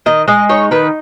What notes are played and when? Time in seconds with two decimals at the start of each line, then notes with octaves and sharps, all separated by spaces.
0.06 D#3 D#5
0.28 G#3 D#5
0.49 D#4 C#5
0.71 D#3 B4